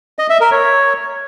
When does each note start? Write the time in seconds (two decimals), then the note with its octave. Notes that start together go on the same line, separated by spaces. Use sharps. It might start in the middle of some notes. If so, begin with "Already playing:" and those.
0.19 D#5
0.30 E5
0.41 A#4
0.51 C#5